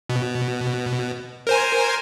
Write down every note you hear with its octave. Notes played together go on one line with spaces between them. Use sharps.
B2
A#4 C5 G#5